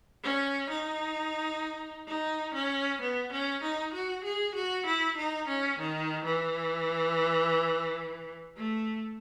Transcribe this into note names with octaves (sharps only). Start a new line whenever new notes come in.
C#4
D#4
D#4
C#4
B3
C#4
D#4
F#4
G#4
F#4
E4
D#4
C#4
D#3
E3
A3